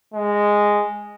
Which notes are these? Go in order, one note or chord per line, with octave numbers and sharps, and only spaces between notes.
G#3